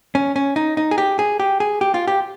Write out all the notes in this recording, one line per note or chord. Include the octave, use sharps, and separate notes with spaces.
C#4
C#4
D#4
D#4
G#4
G4
G#4
G4
G#4
G4
F4
G4